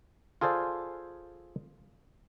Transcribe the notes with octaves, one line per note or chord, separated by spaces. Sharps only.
F4 G#4 A4 C5 D5